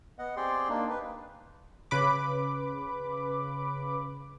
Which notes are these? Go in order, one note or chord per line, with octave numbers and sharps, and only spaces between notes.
B3 D#5 F#5
C4 G4 G#4 D5 G5 C6
A#3 D4 D#4
B4
C#3 B4 B5 D6